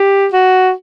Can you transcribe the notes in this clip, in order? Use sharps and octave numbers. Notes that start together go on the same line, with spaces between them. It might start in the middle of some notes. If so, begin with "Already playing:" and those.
Already playing: G4
F#4